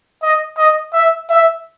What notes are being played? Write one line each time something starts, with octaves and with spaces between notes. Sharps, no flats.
D#5
D#5
E5
E5